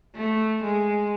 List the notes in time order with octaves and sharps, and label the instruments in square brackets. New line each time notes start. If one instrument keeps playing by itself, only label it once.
[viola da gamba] A3
G#3